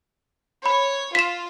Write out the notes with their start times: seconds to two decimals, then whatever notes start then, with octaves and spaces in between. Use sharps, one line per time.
0.66 C#5 B5
1.15 F4 B6 E7